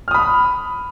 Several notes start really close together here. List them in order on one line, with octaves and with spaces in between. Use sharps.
F6 D#6 B5